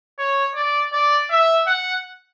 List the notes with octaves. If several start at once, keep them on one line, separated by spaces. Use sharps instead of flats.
C#5
D5
D5
E5
F#5